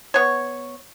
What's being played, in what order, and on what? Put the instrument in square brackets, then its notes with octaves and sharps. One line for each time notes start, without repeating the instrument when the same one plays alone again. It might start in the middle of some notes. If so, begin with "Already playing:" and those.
[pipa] B3 C#5